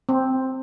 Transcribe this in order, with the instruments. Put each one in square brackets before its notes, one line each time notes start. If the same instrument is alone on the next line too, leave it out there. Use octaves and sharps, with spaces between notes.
[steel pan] C4